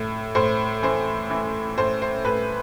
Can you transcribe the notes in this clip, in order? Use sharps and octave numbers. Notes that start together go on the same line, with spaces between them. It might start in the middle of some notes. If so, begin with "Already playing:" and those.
Already playing: A2
A2 C5
E3 C5
E3
A2 C5
C5
A2 B4